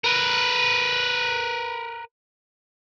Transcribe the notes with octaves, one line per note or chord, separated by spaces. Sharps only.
A#4 B4